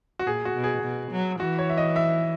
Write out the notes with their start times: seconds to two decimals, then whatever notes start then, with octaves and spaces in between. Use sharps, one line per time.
0.19 F#4
0.26 A#2 G#4
0.45 F#4
0.54 B2
0.64 G#4
0.83 B2
1.11 F#3
1.39 E3 F#4
1.59 C#5
1.70 E5
1.77 D#5
1.96 E5